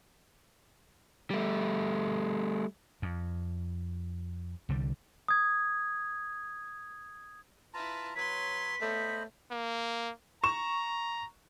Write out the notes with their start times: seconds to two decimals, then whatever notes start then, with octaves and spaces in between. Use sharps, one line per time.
1.30 G3 A3
3.02 F2
4.69 C2 D3 G3
5.28 D#6 G#6
7.74 E4 F4 B4 A5 A#5
8.16 F#3 B4 C#5 C6 B6
8.81 A3 B3 C5 C#5 D#5 B5
9.52 A#3
10.44 A#5 C#6 E7